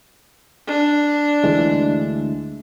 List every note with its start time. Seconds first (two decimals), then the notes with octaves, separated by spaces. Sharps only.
0.67 D4
1.44 D2 E3 G#3